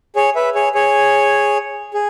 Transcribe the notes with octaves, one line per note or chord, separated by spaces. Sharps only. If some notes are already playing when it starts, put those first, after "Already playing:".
G#4 C#5
B4 E5
G#4 C#5
G#4 C#5
G#4